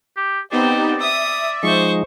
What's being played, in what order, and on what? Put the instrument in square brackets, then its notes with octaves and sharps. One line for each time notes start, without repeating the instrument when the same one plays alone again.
[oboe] G4
[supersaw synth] B3 D#4 G4 [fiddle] C4 C5 [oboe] D5
[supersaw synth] E5 [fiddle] D#6
[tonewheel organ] F3 G#3 D#4 [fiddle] C5 C#6